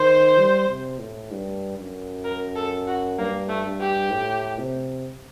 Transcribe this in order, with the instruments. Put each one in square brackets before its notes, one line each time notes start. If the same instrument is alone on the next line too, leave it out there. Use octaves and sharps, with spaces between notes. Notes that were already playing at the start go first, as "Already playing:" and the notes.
Already playing: [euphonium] D#3 [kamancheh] C5
[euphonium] G3
C3
A2
G2
F#2
[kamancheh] A#4
A4
F#4
[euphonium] G2 [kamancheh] A#3
[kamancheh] A3
[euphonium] G2
[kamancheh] G4
[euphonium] A2
C3